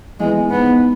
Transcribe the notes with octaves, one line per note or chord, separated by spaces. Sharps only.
E3 G#3 B3
G#2 B3